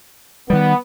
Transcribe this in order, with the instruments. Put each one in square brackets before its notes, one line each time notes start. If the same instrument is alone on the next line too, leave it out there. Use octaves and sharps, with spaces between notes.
[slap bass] D#3 G3 [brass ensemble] B3